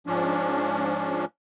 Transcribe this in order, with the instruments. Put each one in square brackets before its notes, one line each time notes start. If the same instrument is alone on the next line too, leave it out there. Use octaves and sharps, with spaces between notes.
[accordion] G#2 F3 C#4 D4